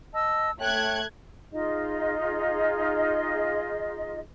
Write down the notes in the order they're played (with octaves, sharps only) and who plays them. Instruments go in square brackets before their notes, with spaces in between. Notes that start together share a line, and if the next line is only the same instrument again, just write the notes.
[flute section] D#5 A5 E6
[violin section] A3 F#6 G#6 [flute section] C#5 G5
[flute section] D#4 F4 G#4 D#5